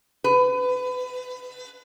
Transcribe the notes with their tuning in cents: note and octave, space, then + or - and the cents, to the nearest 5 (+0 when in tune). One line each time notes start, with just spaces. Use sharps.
B4 +30